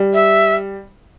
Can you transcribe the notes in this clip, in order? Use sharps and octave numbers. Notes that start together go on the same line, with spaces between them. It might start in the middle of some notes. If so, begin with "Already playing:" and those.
Already playing: G3
E5